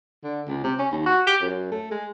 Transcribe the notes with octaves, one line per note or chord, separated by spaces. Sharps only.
D3
C#2
C3
C#4
D#2
F#4
G4
F#2
A3
G#3